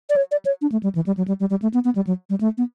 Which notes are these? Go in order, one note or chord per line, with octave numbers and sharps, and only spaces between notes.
D5
C#5
D5
C#5
D4
A3
G3
E3
G3
F#3
G3
G3
G3
A3
B3
B3
G3
F#3
G3
A3
B3